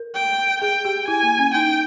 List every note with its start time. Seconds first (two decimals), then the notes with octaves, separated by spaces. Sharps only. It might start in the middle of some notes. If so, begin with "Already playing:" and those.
Already playing: A#4
0.15 G5
0.62 G#4 G5
0.85 G4
1.08 E4 G#5
1.23 A#3
1.38 C#4
1.54 D#4 G5